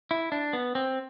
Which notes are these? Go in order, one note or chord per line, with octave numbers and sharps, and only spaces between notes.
E4
D4
B3
C4